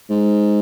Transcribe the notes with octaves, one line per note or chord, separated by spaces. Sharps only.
G#2